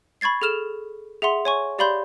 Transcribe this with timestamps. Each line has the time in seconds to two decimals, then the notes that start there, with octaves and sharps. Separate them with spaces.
0.21 B5 C#6 G#6 A6 C7
0.42 G#4 A4 F6 E7 F7
1.22 G#4 E5 F#5 C6
1.45 C#5 G#5 C#6
1.79 G4 D5 F5 B5 C6 G6